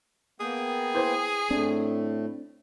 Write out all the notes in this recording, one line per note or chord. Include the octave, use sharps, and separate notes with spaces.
A#3 B3 G#4 G5
E4 B4 C5
A2 A3 C4 D4